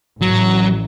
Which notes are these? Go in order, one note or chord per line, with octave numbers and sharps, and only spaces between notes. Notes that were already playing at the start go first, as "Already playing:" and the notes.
A1 F#3